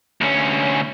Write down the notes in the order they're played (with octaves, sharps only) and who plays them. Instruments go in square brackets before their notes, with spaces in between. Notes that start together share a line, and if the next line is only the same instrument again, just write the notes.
[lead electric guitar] D2 C#4